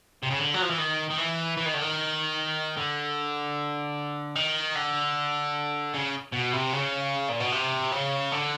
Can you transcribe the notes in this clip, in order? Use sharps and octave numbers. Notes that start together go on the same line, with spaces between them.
C3
C#3
D3
F#3
F3
E3
D#3
D#3
E3
E3
D#3
D3
D#3
D3
D#3
D3
C#3
B2
C3
C#3
A#2
B2
C3
C#3
D3